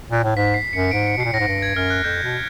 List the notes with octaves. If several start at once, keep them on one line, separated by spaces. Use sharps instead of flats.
A#2
A2
G#2 B6
C7
F#2 C#7
G#2 D7
C#7
B2
A#2 C7
A2 A#6
G#2
G2
G#6
F#2 F6
F#6
F2 G6
B2